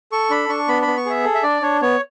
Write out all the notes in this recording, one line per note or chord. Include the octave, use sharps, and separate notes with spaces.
A4 C#6
D4 B5
D4 C#6
B3 B5
B5
B3
C#6
G#4 E5
A4
E5
D4 D5
D4 C#5
B3 C#5